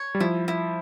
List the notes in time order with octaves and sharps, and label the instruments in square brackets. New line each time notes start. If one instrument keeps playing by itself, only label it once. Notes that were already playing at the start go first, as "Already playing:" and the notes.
Already playing: [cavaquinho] C#5
[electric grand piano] G3
[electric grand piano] F3 [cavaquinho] E4
[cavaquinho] E4